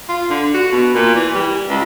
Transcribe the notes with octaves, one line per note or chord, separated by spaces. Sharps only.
F4
D3
F#4
B2
A#2
E3
G3
C#2